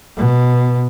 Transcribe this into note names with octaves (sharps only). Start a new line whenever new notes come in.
B2